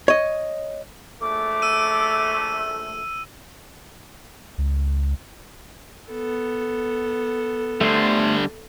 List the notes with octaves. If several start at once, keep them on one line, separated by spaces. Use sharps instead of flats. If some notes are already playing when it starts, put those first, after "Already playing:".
C#5 D#5
A#1 A3 D6
E6 D#7
C#2
B3 A4
D3 G3 A3 C5